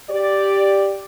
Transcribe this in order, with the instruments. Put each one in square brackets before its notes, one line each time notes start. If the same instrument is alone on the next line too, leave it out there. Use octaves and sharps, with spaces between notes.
[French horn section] G4 D5